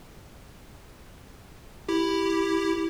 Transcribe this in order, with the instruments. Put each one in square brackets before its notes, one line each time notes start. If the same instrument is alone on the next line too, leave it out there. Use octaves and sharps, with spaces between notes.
[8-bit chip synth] E4 G4